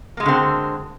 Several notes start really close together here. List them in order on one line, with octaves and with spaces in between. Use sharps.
A#3 G#3 F#4 D3 C4